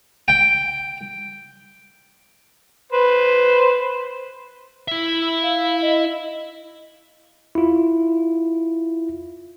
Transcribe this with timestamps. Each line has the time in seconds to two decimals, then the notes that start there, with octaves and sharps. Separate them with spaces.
0.28 G5
2.93 B4 C5
4.88 E4 E5
5.43 F5
5.82 D#5
7.55 E4 F4